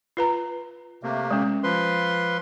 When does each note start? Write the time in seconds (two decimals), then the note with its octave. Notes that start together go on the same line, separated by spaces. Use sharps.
0.17 F4 B4 A#5
1.03 C3 A3 A#3
1.31 G#3 C#4
1.64 F3 B4 C6